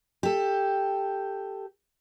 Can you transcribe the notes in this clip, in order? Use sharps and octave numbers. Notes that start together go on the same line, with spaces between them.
G4 A4